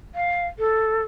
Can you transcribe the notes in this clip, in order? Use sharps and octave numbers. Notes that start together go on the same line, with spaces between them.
F5
A4